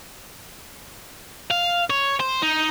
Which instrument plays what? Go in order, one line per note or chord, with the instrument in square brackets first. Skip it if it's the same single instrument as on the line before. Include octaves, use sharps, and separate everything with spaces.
[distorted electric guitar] F5
C#5
C5
D#4